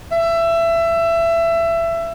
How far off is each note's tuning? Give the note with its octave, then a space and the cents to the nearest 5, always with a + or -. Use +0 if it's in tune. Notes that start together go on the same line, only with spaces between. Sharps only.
E5 +20